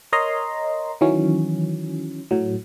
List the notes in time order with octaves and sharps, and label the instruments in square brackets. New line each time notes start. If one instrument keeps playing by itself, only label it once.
[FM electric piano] A#4 C#5 D#5 A#5 C6
D#3 E3 F#3 C#4
A2 F#3